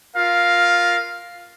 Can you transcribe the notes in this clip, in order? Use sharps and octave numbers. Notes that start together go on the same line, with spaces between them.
F4 A#4 F5